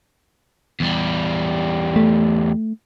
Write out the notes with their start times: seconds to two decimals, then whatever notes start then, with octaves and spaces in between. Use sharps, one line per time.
0.80 E2 G3
1.96 A3